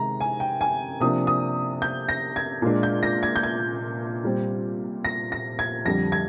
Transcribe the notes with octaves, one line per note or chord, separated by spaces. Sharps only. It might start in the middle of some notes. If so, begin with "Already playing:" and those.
Already playing: C3 D#3 G#3 A#5
G#5
G5
G#5
C3 F3 A#3 D4 D#6
D#6
G6
A#6
G#6
A#2 G#3 D4
G6
A#6
G#6
G6
G#6
A#2 G3 C4
A#6
A#6
G#6
F2 D3 G3 A#6
G#6